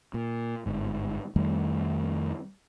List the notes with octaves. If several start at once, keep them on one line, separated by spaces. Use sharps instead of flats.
A#2
G1 G#2
F2 D#3 G3 A3